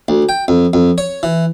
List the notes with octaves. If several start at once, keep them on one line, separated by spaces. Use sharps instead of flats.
D2
G5
F2
F2
C#5
E3